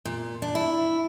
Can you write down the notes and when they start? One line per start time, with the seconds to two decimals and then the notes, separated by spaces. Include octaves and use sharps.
0.05 A#2
0.42 D4
0.55 E4